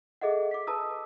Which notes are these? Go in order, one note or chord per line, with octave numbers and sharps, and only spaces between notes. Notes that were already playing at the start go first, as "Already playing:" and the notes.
G#4 A4 D#5 E5 F#5
D6 B6
B4 A5 A#5 D#6 E6